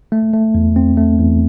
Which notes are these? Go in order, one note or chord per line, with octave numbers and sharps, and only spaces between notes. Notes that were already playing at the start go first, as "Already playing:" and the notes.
A3
A3
E2
C4
A3
E2